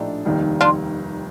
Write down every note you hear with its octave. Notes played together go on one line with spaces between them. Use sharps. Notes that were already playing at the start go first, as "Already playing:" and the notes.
Already playing: A#1 A2 A3 D4 D#4 G4
F1 D#2 D#3 G3
D4 F4